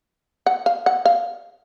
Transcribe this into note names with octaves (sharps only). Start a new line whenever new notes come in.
F#5
F5
F#5
F5